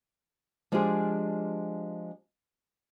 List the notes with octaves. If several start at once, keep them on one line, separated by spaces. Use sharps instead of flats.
F3 G#3 D4 F4 G4 G#4